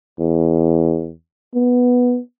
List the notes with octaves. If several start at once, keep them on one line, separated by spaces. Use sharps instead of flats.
E2
B3